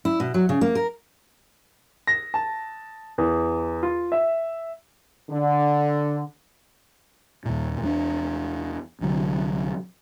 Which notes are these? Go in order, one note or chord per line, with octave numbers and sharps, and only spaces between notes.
E4
B2
F#3
C#3
A#3
A#4
A#6
A5
E2
F4
E5
D3
D#2 A#2
E2 F#3 D4
C2 D3 F#3